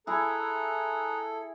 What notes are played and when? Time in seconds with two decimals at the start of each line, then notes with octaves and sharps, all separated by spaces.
0.07 E4 G#4 A4 A#5 D#6 F#6